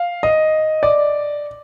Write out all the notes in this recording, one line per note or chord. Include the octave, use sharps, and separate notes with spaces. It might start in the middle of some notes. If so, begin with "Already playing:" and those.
Already playing: F5
D#5
D5